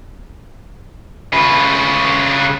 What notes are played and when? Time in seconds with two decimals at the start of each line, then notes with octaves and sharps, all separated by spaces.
1.33 C#3 B4